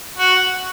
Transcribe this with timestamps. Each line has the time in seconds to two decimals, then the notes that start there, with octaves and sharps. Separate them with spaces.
0.18 F#4